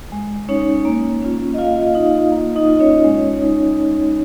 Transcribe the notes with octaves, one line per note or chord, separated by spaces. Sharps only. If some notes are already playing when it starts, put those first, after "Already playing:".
G#3
C#4 D#4 C#5
A#3
C#4 F4
D#5
A#3 F4 F5
D#4
A#3
D#4 D#5
F4
C#4 C#5
G#3
D#4